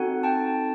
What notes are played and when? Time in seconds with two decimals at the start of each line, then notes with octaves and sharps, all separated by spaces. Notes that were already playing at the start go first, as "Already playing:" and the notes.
Already playing: C4 D#4 F#4 A4 F#5 G#5
0.23 G5 A5